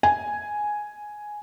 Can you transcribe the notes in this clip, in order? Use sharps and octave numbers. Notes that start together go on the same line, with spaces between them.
G#5